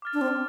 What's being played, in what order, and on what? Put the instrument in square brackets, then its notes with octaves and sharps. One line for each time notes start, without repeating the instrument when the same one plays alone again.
[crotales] D6 F6 A6
[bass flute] D4
C4